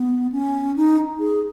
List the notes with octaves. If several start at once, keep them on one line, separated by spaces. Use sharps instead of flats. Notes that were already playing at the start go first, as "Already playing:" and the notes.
Already playing: B3
C#4
D#4
G#4